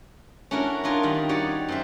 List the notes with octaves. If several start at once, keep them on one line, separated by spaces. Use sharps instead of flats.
C#4 D4 E4 F#4 A#4
D4 D#4 F4 A#4 G#5
D#3 G3 D#5 B5
D#4 F#4 G4 C#5 D5
F#2 C5 E5